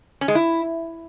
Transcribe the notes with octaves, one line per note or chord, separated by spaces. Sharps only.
C#4
G#3
E4